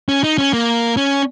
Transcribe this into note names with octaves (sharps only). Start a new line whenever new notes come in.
C#4
D#4
C#4
A#3
C#4